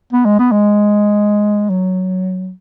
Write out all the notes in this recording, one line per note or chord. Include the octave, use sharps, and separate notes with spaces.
B3
G#3
B3
G#3
F#3